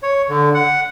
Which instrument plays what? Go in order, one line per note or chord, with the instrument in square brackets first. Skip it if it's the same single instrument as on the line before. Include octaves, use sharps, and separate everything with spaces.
[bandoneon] C#5
D3
F#5